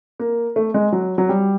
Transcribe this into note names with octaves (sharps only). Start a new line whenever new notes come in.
A#3
A3
G#3
F#3
F#3
G3